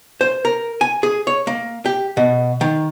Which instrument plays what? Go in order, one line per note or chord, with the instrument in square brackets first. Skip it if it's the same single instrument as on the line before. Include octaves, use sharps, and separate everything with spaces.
[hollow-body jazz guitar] C5
A#4
G#5
G#4
C#5
A#3
G4
B2
D#3